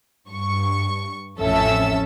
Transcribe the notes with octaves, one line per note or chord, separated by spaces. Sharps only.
G2 C#6
A1 F2 C#4 A4 E5 E6